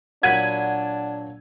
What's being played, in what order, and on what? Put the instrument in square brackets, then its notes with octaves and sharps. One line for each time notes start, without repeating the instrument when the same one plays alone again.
[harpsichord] A#2 F#3 F#4 [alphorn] D4 [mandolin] F#5 B5 [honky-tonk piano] G#6 D#7